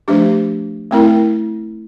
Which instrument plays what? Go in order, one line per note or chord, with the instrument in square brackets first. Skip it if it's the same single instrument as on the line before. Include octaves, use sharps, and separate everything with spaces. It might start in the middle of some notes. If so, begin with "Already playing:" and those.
[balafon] F3 A3 D4 G4
A3 C4 E4 A#4